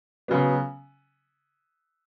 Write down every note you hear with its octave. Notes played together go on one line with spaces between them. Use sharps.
C#3 F#3 B3